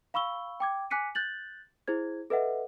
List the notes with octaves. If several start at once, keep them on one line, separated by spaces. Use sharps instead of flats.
F5 B5 C#6 E6 G7
G5 D6 G#6
G#5 D6 F#6 B6 C#7 D#7
F#6 G6 A6 F#7
E4 G#4 C5 G#6
A4 B4 D#5 E5 F#5